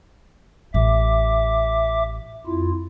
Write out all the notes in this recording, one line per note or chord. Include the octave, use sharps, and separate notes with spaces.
A1 E5 D6
F2 E4 F4